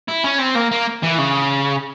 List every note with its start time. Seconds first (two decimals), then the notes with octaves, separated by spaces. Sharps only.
0.08 E4
0.24 C#4
0.39 C4
0.56 A#3
0.71 A#3
1.03 E3
1.18 C#3